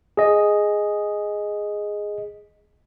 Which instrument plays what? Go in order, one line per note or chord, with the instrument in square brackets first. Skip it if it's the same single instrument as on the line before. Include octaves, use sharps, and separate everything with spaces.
[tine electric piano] G#4 D#5